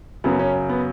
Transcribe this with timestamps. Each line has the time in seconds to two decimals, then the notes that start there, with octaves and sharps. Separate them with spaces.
0.24 F#2 C#3 F#3 B3
0.39 C#4
0.69 B3